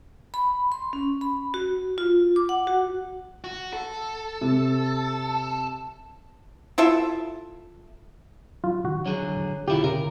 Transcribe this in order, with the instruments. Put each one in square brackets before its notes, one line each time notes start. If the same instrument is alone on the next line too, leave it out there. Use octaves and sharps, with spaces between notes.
[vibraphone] B5
C6
C#4
B5
F#4
F4
D6
F#5
F#4
[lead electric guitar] F#4
A4
[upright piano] C3
[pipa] E4 F4 A4 E5
[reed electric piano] F#3 [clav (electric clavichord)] F4
[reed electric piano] D#3 [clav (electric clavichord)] F#4
[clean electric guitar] D3 F#3 G#4 [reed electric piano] C#5
[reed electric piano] B2 D3 [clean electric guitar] D#3 E4 F4 [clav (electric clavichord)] G4
[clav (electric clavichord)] C#3 [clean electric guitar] A#4